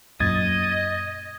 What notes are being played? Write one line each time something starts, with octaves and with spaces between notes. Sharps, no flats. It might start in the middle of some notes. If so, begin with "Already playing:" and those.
F#2 A#2 D#5 D#6 G#6 A6